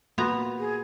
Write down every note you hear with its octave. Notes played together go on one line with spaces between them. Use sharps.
A#3 B3 F4 F#4 A#5 C6
G#4